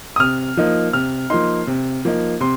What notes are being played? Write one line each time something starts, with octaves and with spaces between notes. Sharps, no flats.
D#6
C3 F6
F3 A#3 D#4
C3 F6
F3 A#3 D#4 C6
C3
F3 A#3 D#4
C3 C6